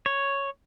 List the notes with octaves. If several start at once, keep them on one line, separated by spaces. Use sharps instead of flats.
C#5